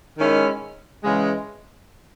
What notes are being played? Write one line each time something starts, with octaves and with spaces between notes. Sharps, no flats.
D#3 G#3 C#4 E4
C#3 E3 G#3